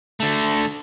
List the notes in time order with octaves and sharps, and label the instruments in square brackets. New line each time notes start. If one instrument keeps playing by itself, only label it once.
[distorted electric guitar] D3 A3